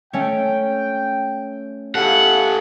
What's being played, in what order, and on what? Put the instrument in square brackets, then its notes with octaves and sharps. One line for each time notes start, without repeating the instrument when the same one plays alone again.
[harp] A3 C#4 [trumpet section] G5
[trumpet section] E4 F5 [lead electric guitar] G4 A4 [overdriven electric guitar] F#5